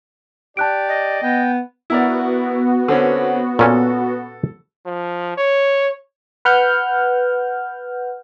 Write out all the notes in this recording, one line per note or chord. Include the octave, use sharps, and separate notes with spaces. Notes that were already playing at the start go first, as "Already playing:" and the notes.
G4 D5 A5 F#6 D7
D#5
B3 G5
B3 E4 F#4 A#4 D5
D3 C4 C#4
A#2 C#4 A4
F3
C#5
B4 F#5 F6 G6